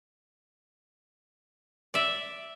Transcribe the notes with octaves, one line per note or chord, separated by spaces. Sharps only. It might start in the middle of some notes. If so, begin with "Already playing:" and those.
D5 E5